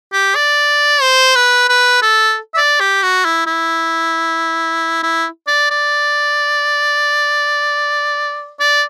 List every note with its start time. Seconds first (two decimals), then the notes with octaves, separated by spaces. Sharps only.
0.13 G4
0.36 D5
1.02 C5
1.36 B4
1.69 B4
2.03 A4
2.54 E5
2.57 D5
2.80 G4
3.03 F#4
3.25 E4
3.47 E4
5.03 E4
5.48 D5
5.71 D5
8.60 D5